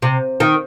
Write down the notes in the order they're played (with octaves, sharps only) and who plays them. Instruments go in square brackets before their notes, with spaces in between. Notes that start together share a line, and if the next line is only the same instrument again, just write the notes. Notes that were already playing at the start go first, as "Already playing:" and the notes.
[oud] C3
D#3